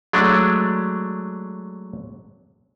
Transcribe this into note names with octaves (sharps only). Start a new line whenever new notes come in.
F#3 G#3 A3 D4